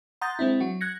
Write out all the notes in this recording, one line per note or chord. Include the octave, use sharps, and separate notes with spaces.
F#5 A#5 C6 D#6 G6 A6
G#3 C4 D4 E4
F#3 F#4
F#6 G#6 A#6 C#7